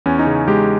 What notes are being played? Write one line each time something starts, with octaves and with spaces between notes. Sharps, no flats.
E2 C#4
D#4
C#3
G#3 G4